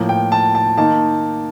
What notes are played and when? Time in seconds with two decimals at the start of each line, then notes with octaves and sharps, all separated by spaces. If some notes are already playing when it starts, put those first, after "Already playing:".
Already playing: A2 F3 A#3
0.09 G5
0.32 A5
0.55 A5
0.77 D#3 A#3 D#4 A5